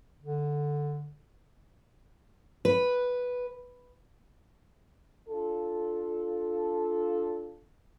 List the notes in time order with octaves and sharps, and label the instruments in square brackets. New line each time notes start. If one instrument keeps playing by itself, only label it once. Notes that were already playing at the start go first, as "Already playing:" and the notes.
[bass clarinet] D3
[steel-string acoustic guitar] B4
[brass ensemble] D4 F4 A4